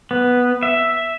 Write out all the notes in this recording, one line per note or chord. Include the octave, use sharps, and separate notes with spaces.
B3
E5